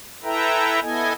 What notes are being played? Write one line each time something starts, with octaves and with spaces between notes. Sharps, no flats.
E4 A4 B4 E5 G5 A#5
B3 E4 A4 D#5 G#5